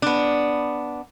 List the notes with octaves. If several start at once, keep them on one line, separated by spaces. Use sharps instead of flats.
B3 D4